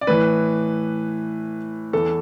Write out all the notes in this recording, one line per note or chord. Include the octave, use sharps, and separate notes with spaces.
D5
A2 E3 B4
E2 E3 A4